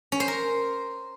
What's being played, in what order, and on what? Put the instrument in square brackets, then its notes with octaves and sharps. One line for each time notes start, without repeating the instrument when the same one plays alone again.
[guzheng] C#4
C5
A#4